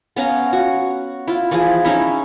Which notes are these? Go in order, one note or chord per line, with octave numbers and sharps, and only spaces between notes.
B3 C#4 F5 A#5
F#4
E4 F4
E3 F3 E4 G#4
C#4 D#4 E4